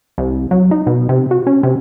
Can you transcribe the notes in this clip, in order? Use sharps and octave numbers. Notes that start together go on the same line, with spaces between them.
C2
F#3
D#4
B2
C3
F#4
C#4
C3